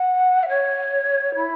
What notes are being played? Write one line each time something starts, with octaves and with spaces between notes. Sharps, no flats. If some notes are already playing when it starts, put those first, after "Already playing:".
Already playing: F#5
E5
C#5
E4